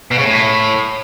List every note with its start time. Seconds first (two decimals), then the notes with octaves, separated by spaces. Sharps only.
0.11 B2
0.18 C#3
0.25 A2